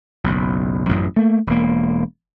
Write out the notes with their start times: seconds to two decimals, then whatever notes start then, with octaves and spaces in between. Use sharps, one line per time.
0.24 F#1 B1
0.89 A1 F#2
1.16 A3 A#3
1.47 E1 A#3